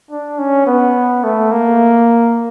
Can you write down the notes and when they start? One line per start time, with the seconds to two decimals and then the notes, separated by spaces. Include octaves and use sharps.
0.11 D4
0.38 C#4
0.67 B3
1.24 A3
1.52 A#3